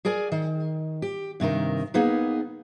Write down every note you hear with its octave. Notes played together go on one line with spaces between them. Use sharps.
G#4 A#4 D5 G#5
D#3
G4
G2 C3 D#3 A#4
A#3 B3 D#4 G#4 B4